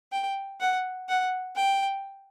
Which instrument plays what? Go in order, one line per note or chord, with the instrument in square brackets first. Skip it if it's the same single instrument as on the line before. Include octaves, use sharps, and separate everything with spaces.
[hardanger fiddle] G5
F#5
F#5
G5